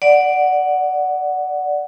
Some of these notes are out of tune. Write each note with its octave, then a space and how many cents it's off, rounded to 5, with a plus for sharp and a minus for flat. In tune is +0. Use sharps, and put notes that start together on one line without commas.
D5 +0 F#5 +0